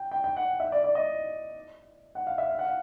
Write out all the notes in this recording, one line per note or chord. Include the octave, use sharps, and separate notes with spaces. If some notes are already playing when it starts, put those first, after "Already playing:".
Already playing: G5
G5
G5
F#5
E5
D5
D5
D#5
F#5
F5
E5
F5
F#5
F5